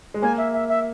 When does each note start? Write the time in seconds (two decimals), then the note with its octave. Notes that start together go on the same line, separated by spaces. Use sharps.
0.14 G#3
0.22 A#3 G#5
0.38 E5
0.53 E5
0.69 E5